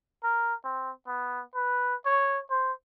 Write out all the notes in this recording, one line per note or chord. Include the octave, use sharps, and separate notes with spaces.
A#4
C4
B3
B4
C#5
C5